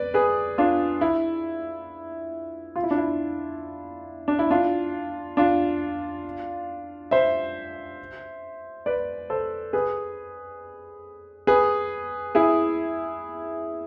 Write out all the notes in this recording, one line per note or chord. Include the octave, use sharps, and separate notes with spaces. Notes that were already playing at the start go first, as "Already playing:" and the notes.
Already playing: B4 D5
G#4 B4
D4 F4
E4
F4
E4
D4
E4
D4
E4
D4 F4
D4 F4
C5 E5
B4 D5
A4 C5
G#4 B4
G#4 B4
E4 G#4